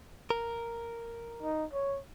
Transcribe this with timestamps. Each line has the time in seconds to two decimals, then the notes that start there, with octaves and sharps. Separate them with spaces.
0.30 A#4
1.43 D#4
1.73 C#5